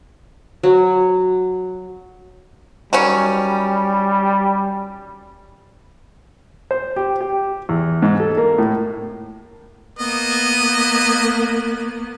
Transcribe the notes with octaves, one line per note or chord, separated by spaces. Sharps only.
F#3
D#3 F#3 G3 C#4
C5
G4
G4
E2
G#2
A4
A#3
A2
A#3 B3 D#5